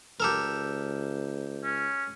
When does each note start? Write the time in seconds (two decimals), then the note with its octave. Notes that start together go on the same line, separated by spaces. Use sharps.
0.20 C#2 G4 A4 A#4
1.63 C#4